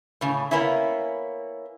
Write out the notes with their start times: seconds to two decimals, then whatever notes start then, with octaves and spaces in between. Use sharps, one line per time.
0.21 A2 C#3
0.51 A#3 B3 C#4 E4